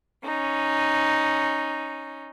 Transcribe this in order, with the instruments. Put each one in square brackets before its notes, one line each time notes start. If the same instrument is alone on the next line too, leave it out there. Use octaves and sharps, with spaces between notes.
[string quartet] C#4 D#4